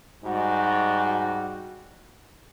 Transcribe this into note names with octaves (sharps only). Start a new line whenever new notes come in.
G#2 G3 F#4